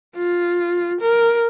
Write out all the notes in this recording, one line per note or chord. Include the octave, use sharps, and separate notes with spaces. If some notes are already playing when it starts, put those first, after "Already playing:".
F4
A#4